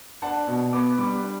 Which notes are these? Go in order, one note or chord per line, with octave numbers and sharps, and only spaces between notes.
D4 F#5 A5
B2
B3 B5 D6
G3 B5 D6
D4